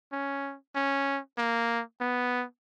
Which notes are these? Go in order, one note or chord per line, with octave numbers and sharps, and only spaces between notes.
C#4
C#4
A#3
B3